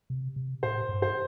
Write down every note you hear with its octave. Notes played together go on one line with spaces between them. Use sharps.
C3
C3
A2 C5
G2
C5